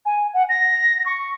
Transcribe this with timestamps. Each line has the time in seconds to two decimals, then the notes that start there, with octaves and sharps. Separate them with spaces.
0.05 G#5
0.33 F#5
0.49 A#6
1.06 C#6